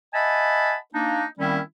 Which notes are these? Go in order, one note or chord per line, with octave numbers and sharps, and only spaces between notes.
D#5 E5 F#5 G#5 A5 B5
A#3 D4 D#4
D#3 G3 A#3 C4 C#4 E4